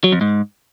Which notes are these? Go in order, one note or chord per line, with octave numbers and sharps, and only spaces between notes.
F#3
F2
G#2